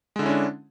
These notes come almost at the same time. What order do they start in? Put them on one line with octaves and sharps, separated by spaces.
G#3 D3 E4 C#4 D4